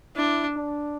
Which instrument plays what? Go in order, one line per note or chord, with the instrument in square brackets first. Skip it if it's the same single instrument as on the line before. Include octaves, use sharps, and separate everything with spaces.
[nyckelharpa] D4 [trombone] E4
[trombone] D4